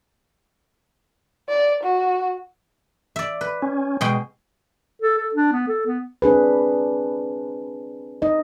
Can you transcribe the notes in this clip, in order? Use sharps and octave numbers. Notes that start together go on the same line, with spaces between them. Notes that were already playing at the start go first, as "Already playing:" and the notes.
D5
F#4
D5 E5
B4
C#4
B2 G#3 G5
A4
A4
D4
B3
A4
B3
C4 D4 G#4 B4
D#4 D#5